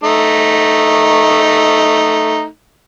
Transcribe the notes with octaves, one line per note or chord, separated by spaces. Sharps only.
A3 D#4